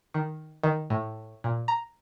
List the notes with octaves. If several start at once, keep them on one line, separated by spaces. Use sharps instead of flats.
D#3
D#3
A2
A#2
A#5